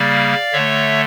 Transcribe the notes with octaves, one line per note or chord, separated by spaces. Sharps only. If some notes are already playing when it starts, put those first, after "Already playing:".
Already playing: C#3 G3 A#3 D5 F5
D3 A3 C#5 E5